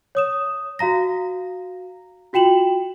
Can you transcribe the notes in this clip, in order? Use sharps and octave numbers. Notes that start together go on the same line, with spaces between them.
C#5 D#6 E7
F#4 F5 A#5 A#6
F4 F#4 G5 E7 F#7